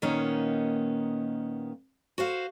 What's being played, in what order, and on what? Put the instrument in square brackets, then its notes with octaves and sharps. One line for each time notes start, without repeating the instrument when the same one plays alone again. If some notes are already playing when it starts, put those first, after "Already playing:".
[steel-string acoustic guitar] A#2 D#3 A#3 B3 C#4 D#4
F#4 C5 F5